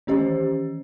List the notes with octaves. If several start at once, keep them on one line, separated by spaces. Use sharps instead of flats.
D#3 E3 C#4 G4 C5 D#5